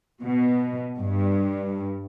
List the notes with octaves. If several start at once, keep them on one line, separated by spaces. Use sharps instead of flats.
B2
G2